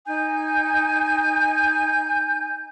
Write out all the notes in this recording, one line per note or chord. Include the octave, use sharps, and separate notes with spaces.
D#4 G#5 G6